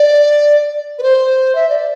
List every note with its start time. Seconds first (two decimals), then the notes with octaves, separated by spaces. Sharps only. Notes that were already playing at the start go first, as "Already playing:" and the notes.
Already playing: D5
0.98 B4
1.03 C5
1.55 E5
1.69 D5